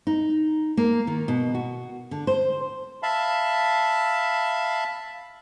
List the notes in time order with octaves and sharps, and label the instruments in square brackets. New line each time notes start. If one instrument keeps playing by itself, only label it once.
[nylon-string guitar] D#4
A#3
D#3
B2
F#4
D3
C5
[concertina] E5 F5 A5 B5